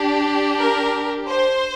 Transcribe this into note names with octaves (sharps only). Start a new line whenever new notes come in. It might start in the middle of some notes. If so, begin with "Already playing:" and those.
Already playing: D4 G4
A#4
C5